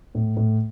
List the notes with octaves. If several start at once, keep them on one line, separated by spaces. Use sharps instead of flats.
A2
A2